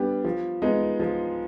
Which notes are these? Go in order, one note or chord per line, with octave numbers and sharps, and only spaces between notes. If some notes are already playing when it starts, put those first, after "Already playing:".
Already playing: G3 B3 D4 G4
F3
G#3 B3 D#4
F3